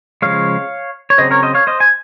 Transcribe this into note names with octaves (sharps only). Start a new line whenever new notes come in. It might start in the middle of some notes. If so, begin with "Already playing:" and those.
C#3 F3 G#3 C#5 F5
C#5
C#3 F#3 C4 C5 D#5
A#4 C#5
C5 D#5
C#5 F5
C5 D#5
G#5